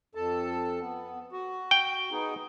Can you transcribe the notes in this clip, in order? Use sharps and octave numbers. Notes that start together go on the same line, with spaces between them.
F2 A4 A5
B3
F#4
G5
B3 D#4 G#4